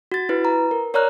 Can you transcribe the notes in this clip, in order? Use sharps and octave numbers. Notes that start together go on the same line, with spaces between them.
F#4 A6
E4 B4
A#5
A#4
A#4 C#5 D5 A#5 F6 F#6